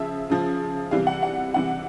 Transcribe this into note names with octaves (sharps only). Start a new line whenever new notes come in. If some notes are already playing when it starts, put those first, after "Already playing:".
Already playing: C#3 F3 E5
C#3 F3
C3 E3 G3 F5
F#5
F#5
C3 E3 G3 F#5